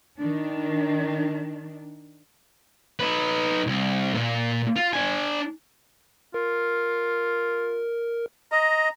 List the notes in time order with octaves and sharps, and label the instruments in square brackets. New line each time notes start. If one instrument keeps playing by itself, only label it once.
[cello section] D#3 D4
[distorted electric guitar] D#4 B4
C2
A#2 A#3
F4
D4 G#5
[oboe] F4 [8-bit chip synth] A#4
[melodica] D#5 [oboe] A#5